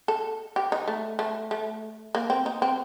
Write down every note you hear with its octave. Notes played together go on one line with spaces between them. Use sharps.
A4
G4
D#4
A3
A3
A3
A#3
C4
D#4
C4